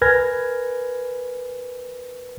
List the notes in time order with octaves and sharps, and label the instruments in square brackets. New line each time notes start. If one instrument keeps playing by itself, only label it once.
[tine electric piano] A#4 B4 G#5 F6 G#6 A#6